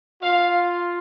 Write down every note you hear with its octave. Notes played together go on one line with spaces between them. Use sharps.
F4 F5